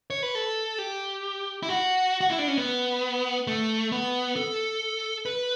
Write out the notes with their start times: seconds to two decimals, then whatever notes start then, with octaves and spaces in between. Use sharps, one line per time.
0.10 C#5
0.23 B4
0.35 A4
0.78 G4
1.63 E4
1.69 F#4
2.21 F#4
2.30 E4
2.39 D4
2.48 C#4
2.58 B3
3.47 A3
3.92 B3
4.36 A4
5.25 B4